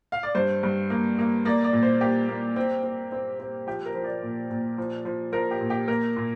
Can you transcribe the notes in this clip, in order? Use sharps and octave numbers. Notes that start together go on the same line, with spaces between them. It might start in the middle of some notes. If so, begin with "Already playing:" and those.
F5
D5
G2 C5
G2
A#3
A#3
A#3 D5
D5
A#2
C5
A#3 G4
A#3
C4
C4
C4
C4
F3 G4
A#4
F3
D5
A#2
A#2
F3
F3
F3 A#4
G4
A#2
G4
A#3 A#4
A#2